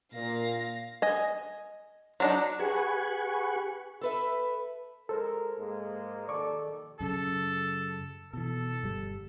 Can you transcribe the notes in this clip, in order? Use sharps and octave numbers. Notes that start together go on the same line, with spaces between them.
A#2 F5 A#6
D#5 G#5
F#3 D4 D#4
G4 G#4 B4 F#5 G#5 C#6
A4 B4 E5
G#3 A4 A#4 C5
G#2 G#3 A#3
D#2 D#3 A4 D5 C#6 D6
F#2 C#3 A4
B2 E3 A4
G1 G3